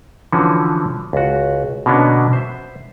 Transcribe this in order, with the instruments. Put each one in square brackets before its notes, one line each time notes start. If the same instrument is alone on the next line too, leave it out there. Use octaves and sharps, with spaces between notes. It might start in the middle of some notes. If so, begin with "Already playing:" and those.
[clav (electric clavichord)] D3 E3 F3 C#4 F#4
C#2 F#4
B2 D3 A#3 B3 C#4 D4
C5 E5